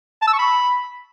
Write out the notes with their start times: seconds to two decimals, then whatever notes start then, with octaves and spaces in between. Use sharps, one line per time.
0.22 A5
0.28 E6
0.33 C#6
0.39 B5